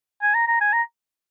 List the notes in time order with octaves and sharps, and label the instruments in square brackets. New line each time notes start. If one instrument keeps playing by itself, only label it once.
[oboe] G#5
A#5
A#5
G#5
A#5